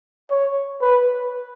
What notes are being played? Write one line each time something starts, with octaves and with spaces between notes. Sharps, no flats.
C#5
B4